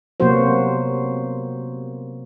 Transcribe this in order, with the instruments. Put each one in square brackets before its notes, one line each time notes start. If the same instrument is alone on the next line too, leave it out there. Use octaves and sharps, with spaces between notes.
[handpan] C3 F#3 A#3 B3 F#4 C5